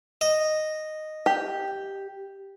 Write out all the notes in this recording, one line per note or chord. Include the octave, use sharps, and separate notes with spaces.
D#5
G4